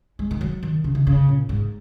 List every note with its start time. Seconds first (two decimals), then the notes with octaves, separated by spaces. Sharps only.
0.19 G#3
0.31 D#3
0.41 F#3
0.63 D#3
0.84 C#3
0.95 D#3
1.07 C#3
1.29 A#2
1.49 G#2